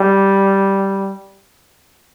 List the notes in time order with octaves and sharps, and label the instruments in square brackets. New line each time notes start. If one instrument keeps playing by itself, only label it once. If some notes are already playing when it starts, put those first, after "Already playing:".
Already playing: [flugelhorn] G3